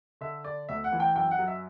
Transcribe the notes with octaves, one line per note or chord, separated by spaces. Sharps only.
D3 E5
D3 D5
D2 E5
F#5
E3
G5
F#2 G5
F#5
F#3
E5